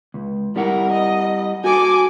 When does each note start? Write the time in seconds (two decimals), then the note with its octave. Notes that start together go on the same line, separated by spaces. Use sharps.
0.14 C#2
0.56 G3 E4 A#4 F#5
0.92 D#5
1.64 F#4 A4 G#5 D6